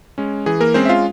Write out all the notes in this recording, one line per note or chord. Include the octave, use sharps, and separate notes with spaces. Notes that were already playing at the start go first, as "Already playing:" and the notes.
G#3 C#4
E3 G#4
A#3 A#4
G#3 C4 C#4 C5
E5
F4 F5